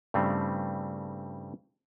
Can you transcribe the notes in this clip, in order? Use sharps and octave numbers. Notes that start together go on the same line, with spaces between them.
G2 C#3 G3 A3 C4 E4